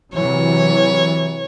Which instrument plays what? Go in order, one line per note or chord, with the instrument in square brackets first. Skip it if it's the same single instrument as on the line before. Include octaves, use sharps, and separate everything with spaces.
[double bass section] C3 E3 F#3 [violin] C#5